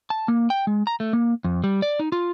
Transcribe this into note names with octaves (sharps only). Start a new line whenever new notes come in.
A5
A#3
G5
G#3
A#5
A3
A#3
F2
G3
D5
D#4
F4